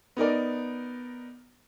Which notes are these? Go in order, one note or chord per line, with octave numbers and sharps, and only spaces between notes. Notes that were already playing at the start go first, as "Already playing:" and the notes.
B3 D#4 A#4 D5